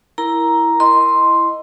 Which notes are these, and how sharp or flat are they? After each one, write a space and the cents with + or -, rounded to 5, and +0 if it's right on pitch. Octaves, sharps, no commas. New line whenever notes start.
E4 +0 A#4 +5 A#5 +5
E4 +5 D#5 +0 C6 +0